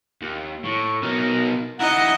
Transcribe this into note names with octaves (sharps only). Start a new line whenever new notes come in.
D#2
A2 C#6
B2 D#4 A#4
D#3 E4 D#5 F#5 A#5